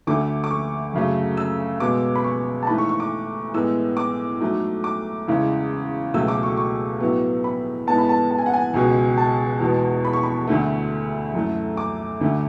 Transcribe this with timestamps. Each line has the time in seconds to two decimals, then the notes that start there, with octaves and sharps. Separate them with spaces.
0.07 D2 D3 A3 D6
0.44 D6
0.50 C#6
0.93 F#2 C#3 F#3 A3
1.37 E6
1.80 B2 G#3 B3 D6
2.15 B5
2.24 C#6
2.63 A5
2.67 G#2 E3 A3 B5
2.78 C#6
2.89 C#6
3.00 D6
3.54 A2 E3 G#3 B3 E6
3.97 D6
4.40 G#2 F#3 A3
4.84 D6
5.27 E2 C#3 E3 G#3
6.14 C#2 B2 F#3 A3 E6
6.28 D6
6.43 C#6
6.57 C#6
7.00 A2 F#3 B3
7.44 B5
7.87 A2 G#3 B3 A5
7.98 B5
8.09 A5
8.31 A5
8.38 G#5
8.46 F#5
8.53 G#5
8.74 C#2 B2 G#3
9.17 A5
9.60 E2 B2 G#3 B3
10.05 B5
10.13 C#6
10.23 B5
10.47 D2 D3 A3
11.34 F#2 E3 A3
11.77 D6
12.21 D2 D3 A3